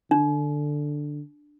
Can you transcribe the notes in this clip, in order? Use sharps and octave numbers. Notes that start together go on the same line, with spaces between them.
D3 D4